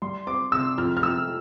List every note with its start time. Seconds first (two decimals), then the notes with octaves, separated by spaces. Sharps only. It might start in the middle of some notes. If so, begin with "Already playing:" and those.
0.02 G3 C6
0.27 C4 D6
0.52 C3 E6
0.78 F2 F6
0.97 F6
1.03 F2 E6